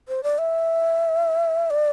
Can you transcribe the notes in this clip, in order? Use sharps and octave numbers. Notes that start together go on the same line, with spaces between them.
C5
D5
E5
D5